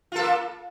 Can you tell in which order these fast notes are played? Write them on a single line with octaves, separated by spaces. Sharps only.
F4 A4 A#3